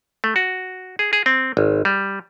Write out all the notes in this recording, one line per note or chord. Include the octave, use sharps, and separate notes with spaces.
A3
F#4
G#4
G#4
C4
G#1
G3